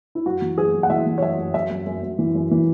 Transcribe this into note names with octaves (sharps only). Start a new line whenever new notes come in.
E4
F#2 F#4
E3
F#2 G#4
F#2
F#5
E3 E5
E3
C#5
F#2 E5
F#2
F#2 E5
F#2
F#2
F#2
E3
F#2
E3